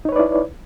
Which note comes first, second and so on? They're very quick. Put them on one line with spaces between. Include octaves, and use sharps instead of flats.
D#4 C#5 B4 D5 E4